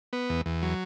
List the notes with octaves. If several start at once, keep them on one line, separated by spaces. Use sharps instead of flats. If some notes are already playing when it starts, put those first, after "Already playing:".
B3
E2
E2
F#3